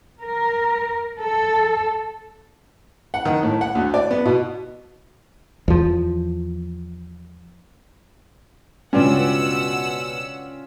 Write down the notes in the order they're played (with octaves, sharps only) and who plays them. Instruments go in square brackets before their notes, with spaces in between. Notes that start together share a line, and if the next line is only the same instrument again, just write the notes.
[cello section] A#4
A4
[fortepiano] F#5
D#3
A2
F#5
D2
D5
B3
B2
[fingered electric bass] E2 F3
[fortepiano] C#2 G2 [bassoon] B2 [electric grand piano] C#4 F4 D5 [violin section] F#5 E6